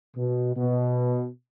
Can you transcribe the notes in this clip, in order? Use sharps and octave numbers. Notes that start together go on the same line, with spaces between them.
B2
B2